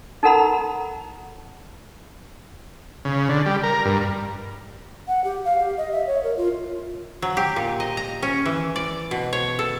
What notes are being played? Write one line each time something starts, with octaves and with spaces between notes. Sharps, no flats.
D#4 A4 A#4 F#5 A#5 B5
C#3
D3
G3
A#4
G2
F#5
G4
F5
G4
D#5
E5
C#5
A#4
F4
F#3
G4
A#2
D#5
A#5
C#4
E3
D5
B2
C#5
A4